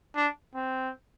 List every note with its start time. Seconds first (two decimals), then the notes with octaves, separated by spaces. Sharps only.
0.16 D4
0.55 C4